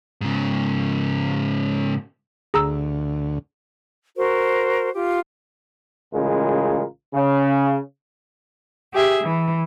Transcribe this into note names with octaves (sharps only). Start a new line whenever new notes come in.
G#2 C#3
D2 G#4 A#5 E6
F#4 A#4 C5
F4 G4
A1 C#3 G#3 F4 A#4
C#3
G4 G#4 E5
E3